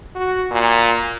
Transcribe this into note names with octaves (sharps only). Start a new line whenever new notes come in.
F#4
A#2